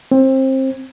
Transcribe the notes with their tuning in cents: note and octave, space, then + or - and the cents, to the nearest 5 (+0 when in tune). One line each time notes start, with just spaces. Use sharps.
C4 +25